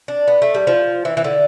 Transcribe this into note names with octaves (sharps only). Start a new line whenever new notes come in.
D4
B3
A3
G3
F3
E3
E3
D3